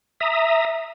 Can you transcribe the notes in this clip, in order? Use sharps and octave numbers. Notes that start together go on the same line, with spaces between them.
E5 A#5 D#6